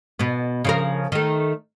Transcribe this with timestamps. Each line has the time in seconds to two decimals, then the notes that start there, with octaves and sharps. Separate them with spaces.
0.19 B2 B3
0.65 C#3 F3 A#4
1.12 D#3 A3